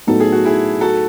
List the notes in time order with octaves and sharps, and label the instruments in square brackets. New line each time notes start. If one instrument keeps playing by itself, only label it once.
[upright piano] A2 F#3 B3 D#4 [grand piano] A4
[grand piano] G#4
F#4
E4 G#4
F#4 A4